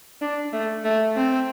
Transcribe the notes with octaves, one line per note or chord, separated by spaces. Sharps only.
D4
A3
A3
C4